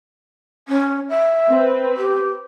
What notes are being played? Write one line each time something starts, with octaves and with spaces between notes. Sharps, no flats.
C#4
E5
C4 B4
G4